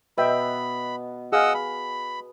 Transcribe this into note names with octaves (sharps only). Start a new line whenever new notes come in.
B2 B3 B4 E5 G5 B5
G#4 D#5 F5 F#5 E6
B5